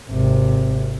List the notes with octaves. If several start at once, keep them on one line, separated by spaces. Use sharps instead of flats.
G#1 C3